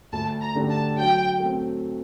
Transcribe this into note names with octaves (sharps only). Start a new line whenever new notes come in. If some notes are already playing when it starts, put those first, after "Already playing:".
D2 A5
A#5
D3 A3 D4 G4
A5
F#3 G5
A3 C4